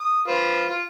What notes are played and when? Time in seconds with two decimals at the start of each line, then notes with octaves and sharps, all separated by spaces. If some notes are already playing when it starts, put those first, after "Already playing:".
0.01 D#6
0.28 F4 B4 C5
0.69 F4